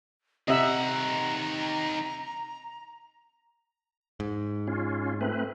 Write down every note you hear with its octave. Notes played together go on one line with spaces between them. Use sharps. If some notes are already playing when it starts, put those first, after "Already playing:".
C3 D#3 D#5 E5 F#5 A#5 E6
G#2
C#4 F4
A3 C4 B4